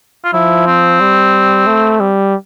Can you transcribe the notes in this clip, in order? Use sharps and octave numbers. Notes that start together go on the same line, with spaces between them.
F4
F3 E4
C4
G3
A3
G3